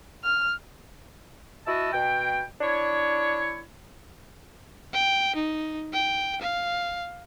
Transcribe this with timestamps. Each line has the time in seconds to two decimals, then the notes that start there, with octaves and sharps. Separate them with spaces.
0.24 F6
1.66 E4 F#4 D#5 A5 E6
1.93 B2 G5
2.61 D4 E4 C#5
4.93 G5
5.36 D#4
5.93 G5
6.42 F5